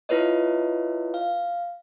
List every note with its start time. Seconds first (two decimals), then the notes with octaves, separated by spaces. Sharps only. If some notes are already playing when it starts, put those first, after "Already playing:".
0.09 E4 F4 B4 C#5 D#5
1.14 F5